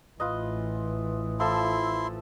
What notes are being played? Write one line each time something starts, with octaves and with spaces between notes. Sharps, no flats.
A1 E3 F4 B4 D#5
F3 E4 A4 E5 C6